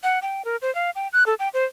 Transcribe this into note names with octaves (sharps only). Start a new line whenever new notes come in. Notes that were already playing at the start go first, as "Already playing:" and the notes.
F#5
G5
A#4
C5
F5
G5
F#6
A4
G5
C5